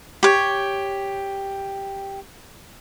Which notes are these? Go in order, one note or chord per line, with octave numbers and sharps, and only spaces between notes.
G4 C#5